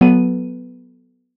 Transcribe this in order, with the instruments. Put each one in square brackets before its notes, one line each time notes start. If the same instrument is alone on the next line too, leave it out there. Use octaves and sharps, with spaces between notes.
[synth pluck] F#3 B3 A4 B4 D#7